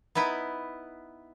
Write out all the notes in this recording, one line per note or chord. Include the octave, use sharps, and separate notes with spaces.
B3 D#4 E4 B4